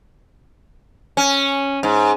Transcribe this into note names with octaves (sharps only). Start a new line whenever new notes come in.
C#4
G#2